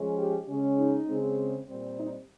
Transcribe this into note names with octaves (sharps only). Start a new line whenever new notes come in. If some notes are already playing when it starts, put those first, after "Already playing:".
Already playing: F3 G#3 C#4
G4
C#3 G#3 C#4
D#4
C#3 G#3 C4
A#2 G3 C4
D#4